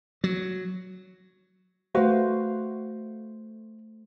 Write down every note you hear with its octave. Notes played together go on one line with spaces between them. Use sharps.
F#3
A3 F#4 B4 C5 F5